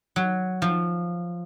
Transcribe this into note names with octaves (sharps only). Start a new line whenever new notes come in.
F#3
F3